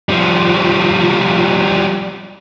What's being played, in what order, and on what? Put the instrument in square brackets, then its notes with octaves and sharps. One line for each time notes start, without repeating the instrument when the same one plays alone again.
[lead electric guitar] F3 G3